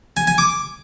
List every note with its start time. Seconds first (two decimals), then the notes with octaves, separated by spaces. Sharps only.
0.17 G#5
0.27 G#5
0.38 D6